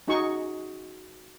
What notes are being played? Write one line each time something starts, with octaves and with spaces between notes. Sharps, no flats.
C#4 D#4 F#4 G#4 C#6